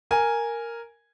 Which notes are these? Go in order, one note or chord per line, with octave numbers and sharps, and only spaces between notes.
A#4 G#5